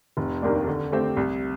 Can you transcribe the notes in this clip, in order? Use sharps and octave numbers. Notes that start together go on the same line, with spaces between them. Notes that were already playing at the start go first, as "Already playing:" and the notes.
F1
D#2 D#3 A#3 D4
D3
A3 C4 G4
C2